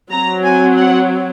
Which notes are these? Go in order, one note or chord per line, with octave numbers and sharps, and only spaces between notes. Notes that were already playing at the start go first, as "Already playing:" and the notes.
F#3 C4 A#5
G#5
F#5